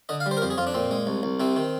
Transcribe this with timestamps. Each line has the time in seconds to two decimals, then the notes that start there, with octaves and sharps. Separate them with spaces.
0.09 D3 D#5
0.20 F5
0.26 G3
0.31 C5
0.37 A#4
0.42 F2 C5
0.50 G#4
0.58 F2 F4
0.67 D4
0.74 A#2 C4
0.91 G#3
1.07 C2
1.23 C2
1.40 C3 C4
1.56 D#3